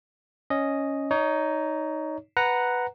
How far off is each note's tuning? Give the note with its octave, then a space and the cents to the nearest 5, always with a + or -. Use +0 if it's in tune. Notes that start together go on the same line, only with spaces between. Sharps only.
C#4 +0 D#5 +0
D#4 +0 C#5 +25
B4 +0 F#5 +0 A#5 +0